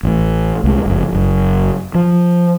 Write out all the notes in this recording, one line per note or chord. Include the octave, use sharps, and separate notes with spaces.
A1 A2
C2 G#3
F#1 F2
F#1 F#2
F3